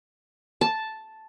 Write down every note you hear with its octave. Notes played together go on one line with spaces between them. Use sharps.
A5